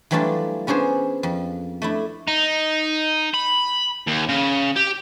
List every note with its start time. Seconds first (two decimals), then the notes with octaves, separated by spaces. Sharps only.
0.11 E3 F#3 G3 A3 D4 F4
0.67 B3 C#4 D4 G#4 C5
1.23 F2
1.82 A3 D4 E4
2.28 D#4
3.34 B5
4.07 D#2
4.29 C#3
4.76 G4